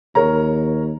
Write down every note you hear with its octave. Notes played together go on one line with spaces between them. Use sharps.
D#2 A#4 C#5 A#5